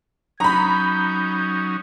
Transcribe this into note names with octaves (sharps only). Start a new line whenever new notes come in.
F#3 C#4 D#4 A#5 B5 G6